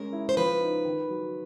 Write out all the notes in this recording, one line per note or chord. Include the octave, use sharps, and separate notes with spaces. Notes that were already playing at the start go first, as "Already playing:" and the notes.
Already playing: G#3 C#4 A#4
E4
C5
F3 B4
D#4
D#3
F#3